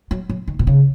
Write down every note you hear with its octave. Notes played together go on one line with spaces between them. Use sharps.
F#3
F#3
D#3
B2
C#3